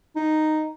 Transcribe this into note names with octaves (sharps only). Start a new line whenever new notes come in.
D#4